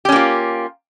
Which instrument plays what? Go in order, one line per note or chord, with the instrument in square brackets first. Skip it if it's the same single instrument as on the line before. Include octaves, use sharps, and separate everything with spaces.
[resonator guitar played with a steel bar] G4
C#4
A#3
F4